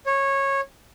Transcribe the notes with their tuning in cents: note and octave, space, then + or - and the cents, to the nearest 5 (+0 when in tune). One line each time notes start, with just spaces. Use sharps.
C#5 -15